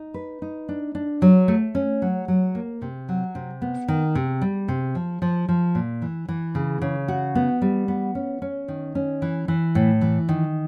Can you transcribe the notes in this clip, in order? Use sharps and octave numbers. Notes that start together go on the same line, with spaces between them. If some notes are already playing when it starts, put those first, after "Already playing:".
Already playing: D#4
B4
D#4
D4
D4
F#3
A3
C#4
F#3
F#3
A#3
C3
F#3
C3
B3
D#3
C3
G3
C3
F3
F3
F3
A#2
E3
E3
C#3
C#3
F#4
B3
G3
B3
C#4
C#4
D#3
C#4
E3
E3
A2
E3
D#3